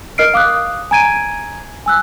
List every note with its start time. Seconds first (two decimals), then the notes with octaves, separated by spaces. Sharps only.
0.18 A#4 D#5 F6 C7 D7
0.34 F5 D6 D#6 F#6
0.91 G#5 A#5 G#6 D7 D#7
1.86 G#5 E6 F#6